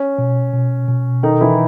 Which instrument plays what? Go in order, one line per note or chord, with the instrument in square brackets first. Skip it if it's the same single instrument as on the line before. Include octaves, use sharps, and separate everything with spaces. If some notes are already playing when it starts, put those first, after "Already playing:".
Already playing: [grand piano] C#4
[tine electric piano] B2
B2
B2
[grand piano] D#3 D#4 [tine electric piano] A4
[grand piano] E3 E4